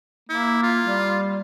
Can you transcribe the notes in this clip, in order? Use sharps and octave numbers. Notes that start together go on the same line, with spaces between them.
A#3 E4
F4
G3